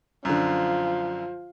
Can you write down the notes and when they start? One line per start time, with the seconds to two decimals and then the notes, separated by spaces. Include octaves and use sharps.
0.25 F#2 D3 F3